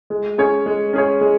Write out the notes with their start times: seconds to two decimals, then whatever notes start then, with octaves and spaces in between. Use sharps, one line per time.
0.10 G#3
0.38 C#4 G#4 C#5
0.66 G#3
0.93 C#4 G#4 C#5
1.21 G#3